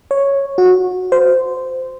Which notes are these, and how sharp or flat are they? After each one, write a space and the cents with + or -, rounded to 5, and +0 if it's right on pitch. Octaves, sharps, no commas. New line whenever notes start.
C#5 -5
F#4 -20
C5 -15